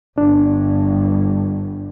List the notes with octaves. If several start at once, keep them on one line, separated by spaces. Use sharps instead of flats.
G1 G2 D4